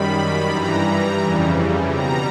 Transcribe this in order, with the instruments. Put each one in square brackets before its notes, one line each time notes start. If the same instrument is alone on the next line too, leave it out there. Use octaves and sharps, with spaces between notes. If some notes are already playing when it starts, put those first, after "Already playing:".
Already playing: [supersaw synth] F#2 D#3 G3 B5
G2 E3 G3 A#5
F2 C#3 E3 G3
B2 G3 A#5